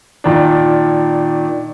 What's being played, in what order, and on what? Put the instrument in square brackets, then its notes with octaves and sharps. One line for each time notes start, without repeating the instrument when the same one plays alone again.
[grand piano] A#2 D#3 D4